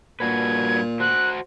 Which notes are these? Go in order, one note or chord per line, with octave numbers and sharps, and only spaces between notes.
G2 A#2 F#4 B4 G#6
F#4 C5 F#6